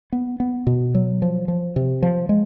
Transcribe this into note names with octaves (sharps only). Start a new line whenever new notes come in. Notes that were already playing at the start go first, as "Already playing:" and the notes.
B3
B3
B2
F#3
F3
F3
C3
F3
G#3